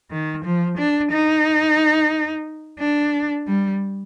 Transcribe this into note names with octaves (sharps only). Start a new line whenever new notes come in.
D#3
F3
D4
D#4
D4
G3